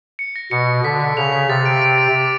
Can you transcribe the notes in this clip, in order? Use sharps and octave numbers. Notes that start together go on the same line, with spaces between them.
C#7
A#6
B2 C#7
C#7
D3 B6
B6
C#3 F7
B6
C3 A6
D7
D7
A6
D6